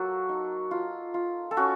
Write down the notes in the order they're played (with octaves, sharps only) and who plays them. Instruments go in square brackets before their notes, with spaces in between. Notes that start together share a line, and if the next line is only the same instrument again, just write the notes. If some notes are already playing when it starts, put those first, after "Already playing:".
Already playing: [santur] F#3 A#3 F#4 A4
D#4
F4
F4
A4
C#4 F#4